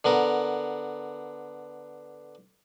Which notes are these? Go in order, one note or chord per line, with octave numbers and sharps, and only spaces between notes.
D3 B3 A#4